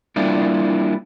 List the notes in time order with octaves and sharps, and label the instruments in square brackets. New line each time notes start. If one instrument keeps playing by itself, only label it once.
[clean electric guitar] G3 A#3 D4 E4 F4